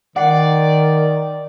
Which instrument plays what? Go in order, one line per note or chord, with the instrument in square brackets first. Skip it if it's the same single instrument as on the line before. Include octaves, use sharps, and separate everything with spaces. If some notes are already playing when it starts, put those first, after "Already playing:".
[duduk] D#3 [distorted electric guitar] D5 [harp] F#5 C7